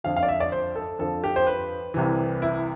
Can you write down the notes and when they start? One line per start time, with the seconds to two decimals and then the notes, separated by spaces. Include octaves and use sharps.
0.04 F2 D3 F3 F5
0.16 F5
0.23 D5
0.28 E5
0.40 D5
0.52 C5
0.75 A4
0.99 F2 D3 F3 A4
1.24 G4
1.36 C5
1.47 B4
1.94 C2 C3 E3
2.42 E4